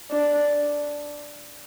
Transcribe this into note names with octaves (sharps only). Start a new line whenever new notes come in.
D4